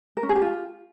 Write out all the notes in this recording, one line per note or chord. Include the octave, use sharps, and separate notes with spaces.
A#4
C#4
G#4
G4
F4